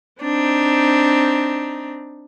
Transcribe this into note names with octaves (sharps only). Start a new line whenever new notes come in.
C4 D4 D#4